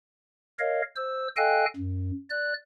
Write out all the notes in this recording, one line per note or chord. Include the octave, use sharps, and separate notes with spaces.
A#4 C#5 D#5 F5
C5 E6
A4 D#5 F5 G5 G#5 F#6
F#2
D5 F#6